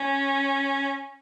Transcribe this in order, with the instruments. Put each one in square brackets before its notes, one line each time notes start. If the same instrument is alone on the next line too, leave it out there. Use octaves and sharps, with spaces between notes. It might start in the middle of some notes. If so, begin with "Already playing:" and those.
Already playing: [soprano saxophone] C#4